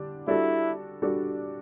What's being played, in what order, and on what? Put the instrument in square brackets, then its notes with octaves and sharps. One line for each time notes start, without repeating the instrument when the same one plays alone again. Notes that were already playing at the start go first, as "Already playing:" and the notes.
Already playing: [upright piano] D3 G3 D4
[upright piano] G3 D4 F#4 A4 [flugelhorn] E4
[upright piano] G3 D4 F#4 A4